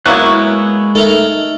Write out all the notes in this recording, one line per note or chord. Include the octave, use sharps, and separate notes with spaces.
F#3 G#3 A#3 B3 E4 C#6 F#6
A3 D#4 A4 A#4 E5